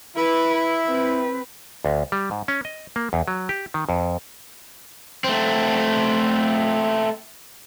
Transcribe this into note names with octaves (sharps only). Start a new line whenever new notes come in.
E4 B4
C4 B4
D2
G3
G#2
C#4
D#5
A#3
E2
F#3
G4
D#3
F2
A3 C4